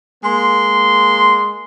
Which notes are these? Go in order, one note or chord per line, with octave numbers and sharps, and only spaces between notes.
G#3 A#3 C6